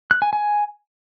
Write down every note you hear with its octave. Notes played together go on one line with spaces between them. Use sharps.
F#6
G#5
G#5